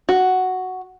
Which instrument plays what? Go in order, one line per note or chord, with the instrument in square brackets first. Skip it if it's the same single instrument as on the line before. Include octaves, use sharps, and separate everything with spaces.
[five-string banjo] F#4